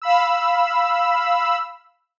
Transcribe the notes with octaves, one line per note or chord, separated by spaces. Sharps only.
F5 B5 E6